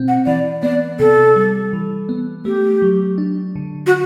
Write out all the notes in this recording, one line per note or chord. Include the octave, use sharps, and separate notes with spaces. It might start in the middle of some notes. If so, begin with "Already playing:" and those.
Already playing: B2 C4
F#5
E3 D5
B3 D5
C3 A4
G3
E3
B3
A3 G4
F#3
D4
D3
F#4